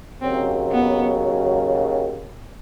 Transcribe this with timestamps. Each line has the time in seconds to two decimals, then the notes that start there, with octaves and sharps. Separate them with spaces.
0.21 D#2 C#3 F#3 C4
0.72 B3